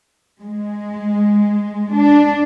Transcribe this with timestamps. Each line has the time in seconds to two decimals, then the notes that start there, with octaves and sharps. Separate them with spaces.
0.40 G#3
1.94 D4